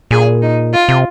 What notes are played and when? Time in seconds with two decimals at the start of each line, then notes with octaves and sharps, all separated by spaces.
0.11 A#2 G#4
0.42 D#4
0.73 F4
0.89 C3